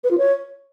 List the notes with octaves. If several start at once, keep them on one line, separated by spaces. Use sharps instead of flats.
B4
F4
C#5